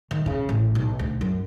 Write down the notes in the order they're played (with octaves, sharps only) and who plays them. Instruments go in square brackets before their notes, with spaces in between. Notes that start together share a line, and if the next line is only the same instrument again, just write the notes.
[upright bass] D#3
C#3
A1
B1
D2
F#2